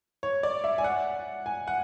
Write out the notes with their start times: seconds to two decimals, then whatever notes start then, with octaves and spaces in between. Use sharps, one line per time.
0.23 C#5
0.43 D5
0.64 E5
0.78 G#5
0.84 F#5
1.46 G#5
1.68 F#5